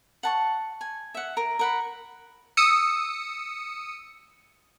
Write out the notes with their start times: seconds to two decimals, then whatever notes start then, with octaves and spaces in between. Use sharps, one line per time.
0.23 F#5 A5 C#6
0.81 G#5
1.15 E5 F#5
1.37 A#4
1.59 A#4 F#5 B5
2.57 D#6 E6 C#7